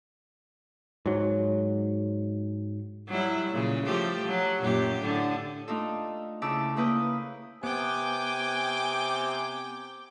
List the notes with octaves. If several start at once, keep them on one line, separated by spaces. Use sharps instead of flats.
G#2 F#3
F#3 G3 E4
A#2 C#3
F3 A3 G4
F#3
F#2 A#2 G4
A2 D3
A3 D4 D#4 F4 A4
D2 C#3 E4 A5 D6 E6
C#3 A#3 E4 B4 D#6 G6
C3 B3 G5 G#5 D6